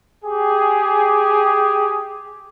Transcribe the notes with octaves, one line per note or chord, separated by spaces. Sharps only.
G4 G#4